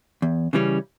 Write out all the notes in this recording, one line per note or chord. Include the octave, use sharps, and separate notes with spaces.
E2
C#3 E3 G3 C#4